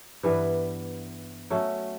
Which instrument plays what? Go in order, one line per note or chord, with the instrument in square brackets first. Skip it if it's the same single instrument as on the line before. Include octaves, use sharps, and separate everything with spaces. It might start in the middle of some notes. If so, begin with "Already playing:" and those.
[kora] G2 E3 G3 B3
F#3 A3 C#4